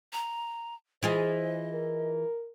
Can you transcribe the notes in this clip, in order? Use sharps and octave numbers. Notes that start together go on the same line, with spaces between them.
A#5
E3 F4 G#4 C5 D#5
A#4